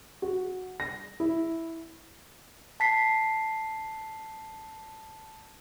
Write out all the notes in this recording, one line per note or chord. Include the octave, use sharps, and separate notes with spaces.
F#4
A#6
E4
A5 B6 C7